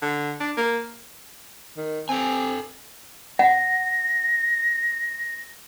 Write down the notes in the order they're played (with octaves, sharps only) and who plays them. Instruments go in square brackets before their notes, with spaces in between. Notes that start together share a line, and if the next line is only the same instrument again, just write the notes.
[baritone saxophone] D3
D4
A#3
[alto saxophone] D#3
[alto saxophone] C4 [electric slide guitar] A4 G5 G#5
[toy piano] F#5 [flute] A#6